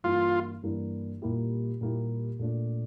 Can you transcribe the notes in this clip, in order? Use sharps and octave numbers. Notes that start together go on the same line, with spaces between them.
G2 E3 A#3 D4 F4
G2 E3 A#3 D4
A#2 G3 A#3 E4 G4
A#2 G3 A#3 E4 G4
A#2 A3 D4 F4